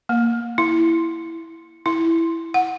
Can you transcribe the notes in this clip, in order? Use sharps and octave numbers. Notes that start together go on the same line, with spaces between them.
A#3
E4
E4
F#5